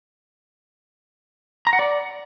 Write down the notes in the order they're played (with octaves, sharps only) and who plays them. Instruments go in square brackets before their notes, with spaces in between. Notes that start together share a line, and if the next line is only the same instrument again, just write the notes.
[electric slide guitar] A#5
F#5
D5